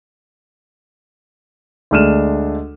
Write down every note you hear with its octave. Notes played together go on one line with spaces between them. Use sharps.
D2 G#3 D4 F6 D#7 E7